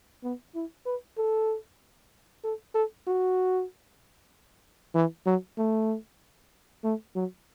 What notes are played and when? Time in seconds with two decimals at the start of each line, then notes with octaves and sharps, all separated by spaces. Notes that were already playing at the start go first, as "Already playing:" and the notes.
0.23 B3
0.55 E4
0.86 B4
1.18 A4
2.44 A4
2.74 A4
3.07 F#4
4.95 E3
5.26 F#3
5.58 A3
6.84 A3
7.15 F#3